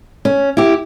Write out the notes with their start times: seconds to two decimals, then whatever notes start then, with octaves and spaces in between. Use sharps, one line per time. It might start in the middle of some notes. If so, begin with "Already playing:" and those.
0.25 C#4
0.57 E4 G4